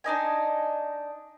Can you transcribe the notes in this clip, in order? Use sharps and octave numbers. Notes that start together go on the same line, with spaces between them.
D4 D#4 D#5 G#5